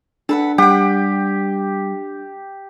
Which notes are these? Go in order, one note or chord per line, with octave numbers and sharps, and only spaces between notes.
D4 A4 B4 F#5
G3 G4 F#5 G5